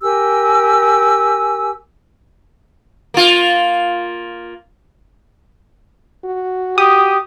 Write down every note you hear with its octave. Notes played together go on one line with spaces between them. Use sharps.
G4 A#4 G#5 E6
A#3 F4
F#4
G4 D#6